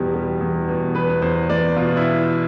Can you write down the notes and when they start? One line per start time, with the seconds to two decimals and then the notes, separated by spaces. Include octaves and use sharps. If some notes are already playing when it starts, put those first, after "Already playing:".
Already playing: E2 B2 G3 G4
0.14 G3
0.41 E2
0.69 B2
0.95 E2 B4
1.22 E2 C5
1.49 E2 D5
1.76 B2 F4
1.97 E4